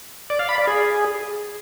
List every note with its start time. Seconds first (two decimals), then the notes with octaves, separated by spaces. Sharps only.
0.30 D5
0.39 F5
0.49 B5
0.58 D5
0.67 G#4